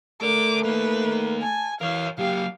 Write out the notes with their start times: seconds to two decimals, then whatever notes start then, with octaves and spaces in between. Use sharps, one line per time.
0.22 A3 A4 A#4 D5 D6
0.65 A#3 D#4 B4
1.42 G#5 A5
1.81 E3 A#4 C#5 F5
2.19 F#3 A#3 G4 F5